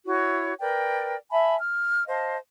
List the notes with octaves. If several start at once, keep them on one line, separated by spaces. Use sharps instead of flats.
E4 F#4 C#5
A#4 B4 D5 G5
E5 G#5 A5 B5
F6
C5 D#5 F5 A5